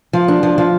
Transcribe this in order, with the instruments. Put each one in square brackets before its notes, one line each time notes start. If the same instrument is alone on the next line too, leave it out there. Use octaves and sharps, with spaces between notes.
[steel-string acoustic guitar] F3
D4
F3
F3